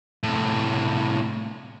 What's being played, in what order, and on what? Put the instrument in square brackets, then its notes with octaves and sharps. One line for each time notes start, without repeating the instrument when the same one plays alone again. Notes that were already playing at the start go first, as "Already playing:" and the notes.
[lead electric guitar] A2 C3